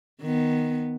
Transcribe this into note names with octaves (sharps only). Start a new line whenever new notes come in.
D#3 B3